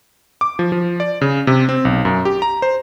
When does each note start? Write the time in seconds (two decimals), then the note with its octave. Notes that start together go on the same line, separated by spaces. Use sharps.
0.41 D6
0.59 F3
0.72 F3
1.00 D5
1.21 C#3
1.47 C3
1.69 C4
1.85 B1
2.05 F#2
2.25 G4
2.42 A#5
2.62 C5